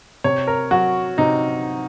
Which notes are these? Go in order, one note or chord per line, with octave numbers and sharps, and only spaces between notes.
C3 C#5
A#4
F#3 F#4
C3 D#4